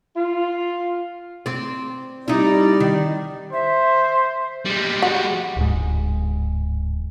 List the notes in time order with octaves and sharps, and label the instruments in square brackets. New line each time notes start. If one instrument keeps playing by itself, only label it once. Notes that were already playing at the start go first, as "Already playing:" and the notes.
[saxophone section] F4
[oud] C4 D5
[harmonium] G3 D5 [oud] D#4 E4
[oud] D#3
[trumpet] C5 [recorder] E5
[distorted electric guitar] G3 G#3
[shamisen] F#4
[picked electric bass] D1 G#2